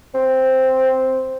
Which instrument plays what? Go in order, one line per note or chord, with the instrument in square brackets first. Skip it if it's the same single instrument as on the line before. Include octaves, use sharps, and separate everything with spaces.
[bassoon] C4